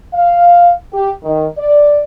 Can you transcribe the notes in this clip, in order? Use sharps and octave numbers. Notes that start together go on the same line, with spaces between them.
F5
G4
D#3
D5